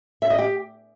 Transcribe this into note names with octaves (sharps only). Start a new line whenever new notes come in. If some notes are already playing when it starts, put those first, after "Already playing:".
E5
D#5
G4